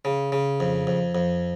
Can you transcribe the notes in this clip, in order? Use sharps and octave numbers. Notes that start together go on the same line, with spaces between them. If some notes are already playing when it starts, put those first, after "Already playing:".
C#3
C#3
F2
F2
F2